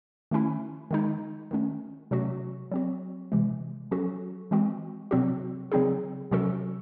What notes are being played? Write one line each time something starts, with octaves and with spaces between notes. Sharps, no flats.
D#3 A3 C#4 E4
D#3 G#3 D#4
D#3 A3 C#4
C3 F#3 A3 C#4 F#4
F#3 C4 F#4
C3 E3 G#3
F#3 C#4 F#4 A4
E3 G#3 C4 F#4
C3 F#3 C4 F#4
C#3 F#3 C4 D#4 G#4
C3 F#3 C#4 F#4 A4